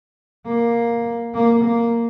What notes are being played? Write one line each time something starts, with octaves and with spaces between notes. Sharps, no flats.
A#3
A#3
A#3